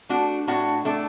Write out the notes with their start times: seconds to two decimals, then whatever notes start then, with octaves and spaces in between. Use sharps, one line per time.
0.09 A3 D4 F#4
0.48 A2 D4 F#4
0.85 A2 A3 D4